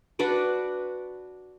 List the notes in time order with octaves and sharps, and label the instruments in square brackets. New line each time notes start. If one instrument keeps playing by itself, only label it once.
[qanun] D4 F#4 B4 D5